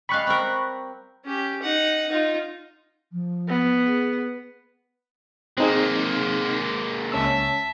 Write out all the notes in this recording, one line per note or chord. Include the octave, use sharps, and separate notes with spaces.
G3 G#3 F5 B5 C#6 F#6
C4 A#4
C#4 G4
D#4 F#5
D#4 F4
F3
B3
G#4
G#3 A#3 C4 D#4 G#4
C#2 C#4 E5 A5 E6